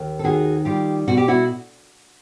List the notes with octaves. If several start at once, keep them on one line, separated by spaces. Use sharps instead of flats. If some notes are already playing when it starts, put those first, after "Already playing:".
Already playing: D#2
A4
D#3 F#4 G#4
G3 F4 G4
B2 F#4
G4
E4 F#4